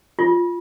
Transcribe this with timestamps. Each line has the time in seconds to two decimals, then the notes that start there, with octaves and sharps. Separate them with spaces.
0.19 F4